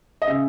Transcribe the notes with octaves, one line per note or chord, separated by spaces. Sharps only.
D#5
C#3 E5